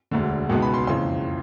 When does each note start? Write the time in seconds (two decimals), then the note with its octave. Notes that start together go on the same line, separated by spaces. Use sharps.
0.11 E1 D2 D3
0.49 C#2 B2 G#3 B3 D#4 F#5
0.62 B5
0.74 C6
0.87 F#1 F2 C#3 E3 C6